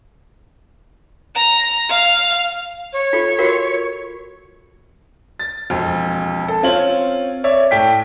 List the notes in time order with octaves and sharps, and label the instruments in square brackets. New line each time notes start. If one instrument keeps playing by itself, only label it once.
[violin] A#5
F5
[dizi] C#5
[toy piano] F4 A4
F4 F#4 A#4
[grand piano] A6
E1 F2
A4
C4 C#4 F4 C#5 F#7
C#5 D5 E5
A2 G5 B6